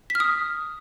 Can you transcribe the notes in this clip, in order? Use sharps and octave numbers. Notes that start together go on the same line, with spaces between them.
B6
F6
D#6